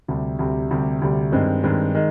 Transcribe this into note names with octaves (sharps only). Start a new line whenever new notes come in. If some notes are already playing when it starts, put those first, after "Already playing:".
D2 C3 G3
D2 C3 G3
D2 C3 G3
D2 C3 G3
G2 D#3 G#3 C4
G2 D#3 G#3 C4
D#3 G#3